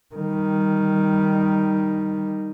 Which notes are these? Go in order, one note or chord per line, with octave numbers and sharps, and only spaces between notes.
D#3 G3